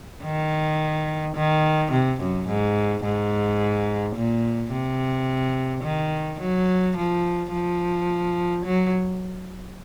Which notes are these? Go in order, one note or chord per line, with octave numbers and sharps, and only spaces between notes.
D#3
D#3
C3
F#2
G#2
G#2
A#2
C3
D#3
F#3
F3
F3
F#3